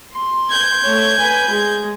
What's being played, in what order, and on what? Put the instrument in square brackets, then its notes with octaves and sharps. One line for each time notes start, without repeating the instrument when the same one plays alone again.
[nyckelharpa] C6
[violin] G6 G#6
[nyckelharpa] A3 C#5
B4 G#5
G#3 G#4